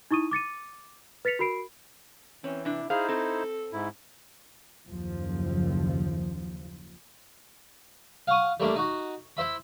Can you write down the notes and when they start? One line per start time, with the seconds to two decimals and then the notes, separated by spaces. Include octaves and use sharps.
0.11 D#4 E4 C#6 D#6 D#7
0.31 D6 A6 C#7 D#7
1.25 B4 A6 B6 C#7 F7
1.39 F#4 A#4 B5 C7 D7
2.44 E3 C4 C#4
2.65 C3 D4 E4
2.90 D#4 E4 G#4 C5 F5
3.09 C4 A4
3.73 G#2 E4
4.87 F#1 D#2 F3
8.27 F5 F#5 C#6 D#6
8.60 G3 A3 A#3 D4
8.76 D#4 F#4
9.37 E4 C5 E5 B5